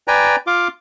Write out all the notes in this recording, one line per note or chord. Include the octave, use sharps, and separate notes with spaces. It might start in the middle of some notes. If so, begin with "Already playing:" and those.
B4 D5 G5 G#5 A#5
F4 F5 D6